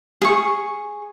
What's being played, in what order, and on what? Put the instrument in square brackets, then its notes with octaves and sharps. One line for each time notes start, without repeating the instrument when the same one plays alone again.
[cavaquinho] G#4 C#6